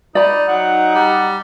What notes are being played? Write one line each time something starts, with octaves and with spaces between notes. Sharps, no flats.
D#4 D5 B5
F#3 D#4 F#5
G3